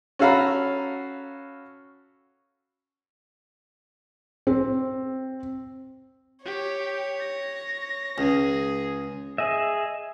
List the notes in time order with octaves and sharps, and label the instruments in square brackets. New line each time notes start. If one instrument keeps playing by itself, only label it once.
[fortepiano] C#4 F#4 A4 F5 A#5 B5
[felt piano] C4
[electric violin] G4 [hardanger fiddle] C#5
[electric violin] A#6
[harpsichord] C#2 [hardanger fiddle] G#4
[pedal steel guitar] G#4 D#5 E5